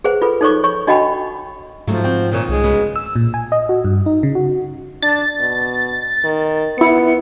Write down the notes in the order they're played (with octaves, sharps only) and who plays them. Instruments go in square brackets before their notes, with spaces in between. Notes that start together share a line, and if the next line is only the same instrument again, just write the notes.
[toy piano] G#4 B4 C5 F#5
F4 A4 B4
D#4 A4 C5 C#5 C#6 D6
C#5 C#6
D4 F#4 D#5 F#5 G5 B5
[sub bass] G#2 [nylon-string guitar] C#3 F#3 A3 [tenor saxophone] F3
[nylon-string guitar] C4 F#4 G5
[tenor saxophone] A#2 [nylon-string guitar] D#3 D#4 C#5
[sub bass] C2 [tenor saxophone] G#3
[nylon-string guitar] C#3 B3 F#4
[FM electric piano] E6
A#2
G#5
D#5
F#4
G2
D#4
C#3
F#4
[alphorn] D4 [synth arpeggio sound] A6
[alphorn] B2
D#3
[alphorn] B3 [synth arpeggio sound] E4 C#7